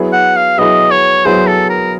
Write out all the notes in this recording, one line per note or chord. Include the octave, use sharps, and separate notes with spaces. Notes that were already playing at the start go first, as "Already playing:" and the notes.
Already playing: F#3 B3 E4 G#4
F#5
F5
F#3 B3 E4 G#4 D#5
C#5
F#3 B3 E4 G#4 C5
A4
A#4